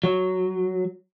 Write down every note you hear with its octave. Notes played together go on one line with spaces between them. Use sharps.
F#3